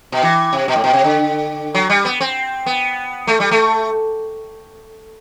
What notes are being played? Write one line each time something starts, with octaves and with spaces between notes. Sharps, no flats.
B2
E3
C3
B2
A2
B2
C3
D3
F#3
G3
B3
C4
B3
A3
G3
A3